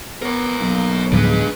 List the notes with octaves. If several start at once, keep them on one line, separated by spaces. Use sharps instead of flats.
B3 A#4 C#5
B1 A#3
D2 A2 F3 G#3 D4 B4